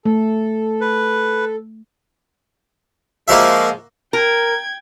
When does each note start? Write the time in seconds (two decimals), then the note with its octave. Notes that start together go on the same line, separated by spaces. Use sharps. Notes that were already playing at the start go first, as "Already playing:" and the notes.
0.05 A3 A4
0.81 B4
3.28 F3 G#3 A#3 F#4 E5
4.13 A#4 G5 G#6